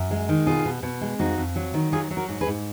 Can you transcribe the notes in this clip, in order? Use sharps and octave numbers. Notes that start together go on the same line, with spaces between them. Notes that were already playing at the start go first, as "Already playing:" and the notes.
Already playing: F#2
G#3
D#3
B2 F4 G#4
B2
B2
G#3
F2 D#4 F#4
F2
F#3
D#3
F#3 F4 G#4
F#3
F#4 A#4
G#2
G#4 B4
G#2